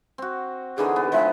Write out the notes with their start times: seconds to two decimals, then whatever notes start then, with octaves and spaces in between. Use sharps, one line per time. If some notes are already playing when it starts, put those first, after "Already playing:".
0.18 C4 F#4
0.78 D3 E3 D#4 G#4
0.96 B3
1.12 F3 G#3 E5